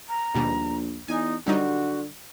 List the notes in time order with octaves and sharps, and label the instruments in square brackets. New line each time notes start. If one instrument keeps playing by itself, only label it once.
[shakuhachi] A#5
[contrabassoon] A#1 [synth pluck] D#2 B2 G3
[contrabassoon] E2 [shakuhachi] D#4 [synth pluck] G#5
[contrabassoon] D3 [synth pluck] F#3 G3 D#4 [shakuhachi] F#4